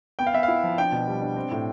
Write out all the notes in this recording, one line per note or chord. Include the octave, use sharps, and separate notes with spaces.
B3 G5
F5
B3 E5
F5
E4
F3
D4 G5
B2
G3
D4
C4
A2